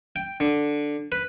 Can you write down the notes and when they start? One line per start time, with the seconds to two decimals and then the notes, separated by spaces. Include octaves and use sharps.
0.16 G5
0.40 D3
1.12 B4